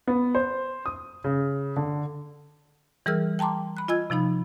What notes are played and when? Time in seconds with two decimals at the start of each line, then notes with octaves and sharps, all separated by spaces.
0.07 B3
0.35 C5
0.86 D#6
1.24 C#3
1.77 D3
3.06 E3 G3 G#4 A#4 E6 F6
3.39 G5 A5 A#5 C6 D6
3.77 B5 F#6
3.88 F4 D#5 G#5 E6 G#6
4.10 C3 F3 D#4 B5